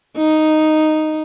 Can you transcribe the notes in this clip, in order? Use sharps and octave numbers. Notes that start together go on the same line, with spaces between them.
D#4